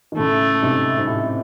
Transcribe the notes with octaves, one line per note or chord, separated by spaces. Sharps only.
D#3
A2 C#3 A3
G#2 C3
G#2
A2